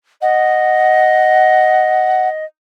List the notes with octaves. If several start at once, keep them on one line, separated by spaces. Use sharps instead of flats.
D#5 F#5